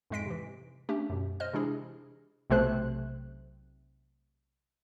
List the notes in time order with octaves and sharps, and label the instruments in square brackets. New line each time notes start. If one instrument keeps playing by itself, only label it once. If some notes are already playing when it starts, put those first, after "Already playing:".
[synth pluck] F2 G#2 G#3 D#5 B6 D7
C3 E3
A3 C#4 D4 G4
F#2 B2
C5 D#5 F6
C3 E3 G#3 D4 E4 G#4
[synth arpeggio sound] B1 C3 A3 C5 F#6